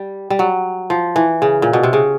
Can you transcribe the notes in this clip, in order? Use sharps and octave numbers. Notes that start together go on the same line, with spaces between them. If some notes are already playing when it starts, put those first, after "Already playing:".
Already playing: G3
G3
F#3
F3
E3
C#3
A#2
B2
C3
C#3